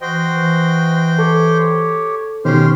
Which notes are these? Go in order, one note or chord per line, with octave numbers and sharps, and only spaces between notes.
E3 F#4 C5 D#5 G5
E3
G4 A4 C#5
B2 D#3 C#4 G4 C5 C6 F6